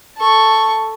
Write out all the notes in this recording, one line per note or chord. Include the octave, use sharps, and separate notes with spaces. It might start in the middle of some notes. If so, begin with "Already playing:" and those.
A4 C#6